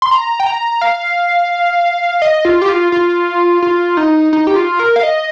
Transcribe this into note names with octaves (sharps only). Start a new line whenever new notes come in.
C6
A#5
G5
A#5
F5
D#5
F4
G4
F4
F4
F4
D#4
D#4
G4
F4
A#4
F5
D#5